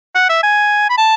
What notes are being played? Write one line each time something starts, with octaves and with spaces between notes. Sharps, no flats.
F#5
E5
G#5
B5
A5